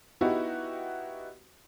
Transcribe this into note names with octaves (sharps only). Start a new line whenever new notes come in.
B3 D#4 E4 F#4 G4